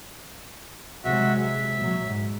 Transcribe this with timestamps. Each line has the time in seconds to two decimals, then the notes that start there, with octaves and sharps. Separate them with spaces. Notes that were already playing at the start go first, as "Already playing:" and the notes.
1.05 C3 F#3 G#3 F#4 E5
1.41 E5
1.75 A#2 F#3
2.06 G#2